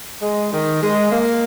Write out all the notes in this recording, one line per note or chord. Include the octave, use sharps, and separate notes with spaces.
G#3
D#3
G#3
A#3